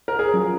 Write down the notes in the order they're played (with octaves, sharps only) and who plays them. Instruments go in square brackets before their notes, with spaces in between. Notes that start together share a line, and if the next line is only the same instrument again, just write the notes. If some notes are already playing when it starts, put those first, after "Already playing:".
[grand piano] A#4
G#4
[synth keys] F#3 C#4 F4 G#4